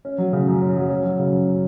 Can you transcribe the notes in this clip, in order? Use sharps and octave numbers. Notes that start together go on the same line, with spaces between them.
C#4
F#3
C#3
F#2
C#4
F#3
C#4
F#3
C#3
F#2
C#4